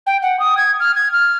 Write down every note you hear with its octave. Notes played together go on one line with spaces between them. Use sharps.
G5
F#5
D#6
G#6
F6
G#6
F6